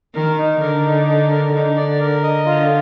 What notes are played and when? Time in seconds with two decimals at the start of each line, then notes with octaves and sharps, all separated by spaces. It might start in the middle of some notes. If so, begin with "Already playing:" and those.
0.15 D#3 A#4
0.38 D#4
0.60 D3 A#4
0.85 D#4
1.07 D#4
1.31 A#4
1.54 D3 D#4
1.76 D5
2.00 A#4
2.23 D#5
2.46 D3 F4